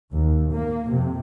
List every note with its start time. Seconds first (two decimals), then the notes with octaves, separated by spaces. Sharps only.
0.12 D#2
0.51 A#3
0.91 F2 C3